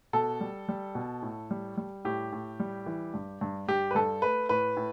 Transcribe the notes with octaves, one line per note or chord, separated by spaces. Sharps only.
B2 A4
G3
G3
B2
A2
G3
G3
A2 G4
A2
G3
E3
G2
G2
G2 G4
B4
G2 A4
A3 B4
A2 B4
A2